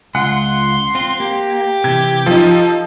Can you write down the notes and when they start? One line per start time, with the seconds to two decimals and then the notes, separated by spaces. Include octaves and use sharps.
0.15 C#2 F4 F#5 C6
0.95 C4 F4
1.20 A#3 G4
1.84 C3 E3 G#6
2.26 F3 D#4 A4